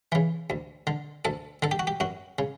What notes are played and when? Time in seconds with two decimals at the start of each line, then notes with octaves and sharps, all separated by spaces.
0.12 C#3 E3
0.50 D2
0.87 D3
1.25 D2 A4
1.62 D3 A4
1.71 G4
1.79 F#4
1.87 G4
2.00 F#2 F#4
2.39 C#3